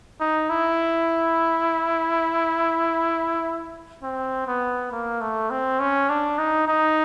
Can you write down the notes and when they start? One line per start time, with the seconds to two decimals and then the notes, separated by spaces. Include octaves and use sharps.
0.20 D#4
0.50 E4
4.03 C4
4.47 B3
4.92 A#3
5.21 A3
5.51 C4
5.80 C#4
6.09 D4
6.39 D#4
6.68 D#4